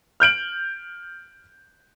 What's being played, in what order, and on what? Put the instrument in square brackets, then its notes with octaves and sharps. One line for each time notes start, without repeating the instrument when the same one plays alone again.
[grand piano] F6 G6 D7 F#7